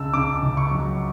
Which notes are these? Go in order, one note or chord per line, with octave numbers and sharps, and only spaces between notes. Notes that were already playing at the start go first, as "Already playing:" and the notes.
Already playing: C#2 C#3 A5 E6
C#3 D6
C#2
C#6
F#3